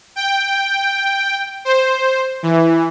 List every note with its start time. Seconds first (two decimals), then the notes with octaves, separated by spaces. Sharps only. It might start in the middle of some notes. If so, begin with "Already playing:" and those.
0.16 G5
1.65 C5
2.43 E3